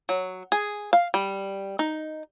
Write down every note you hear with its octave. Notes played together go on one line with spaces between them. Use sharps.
F#3
G#4
F5
G3
D#4